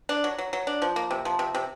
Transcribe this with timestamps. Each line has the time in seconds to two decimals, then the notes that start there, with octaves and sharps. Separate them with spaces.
0.09 D4
0.24 F#3
0.38 F#3
0.53 F#3
0.67 D4
0.82 F3
0.96 A#3
1.11 C3
1.25 F3
1.39 C3
1.55 C3